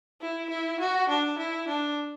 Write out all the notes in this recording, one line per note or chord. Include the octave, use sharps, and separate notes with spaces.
E4
E4
F#4
D4
E4
D4